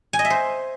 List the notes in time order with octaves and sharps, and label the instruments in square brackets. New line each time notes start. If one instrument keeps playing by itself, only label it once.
[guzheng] G#5
D#5
E5
C5